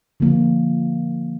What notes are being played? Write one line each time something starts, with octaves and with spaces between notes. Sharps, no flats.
D3 F3 A#3